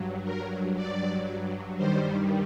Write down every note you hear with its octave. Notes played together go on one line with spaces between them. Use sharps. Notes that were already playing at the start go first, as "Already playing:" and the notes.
Already playing: G2 F#3
A#4
D5
G2 D#3 G3 C5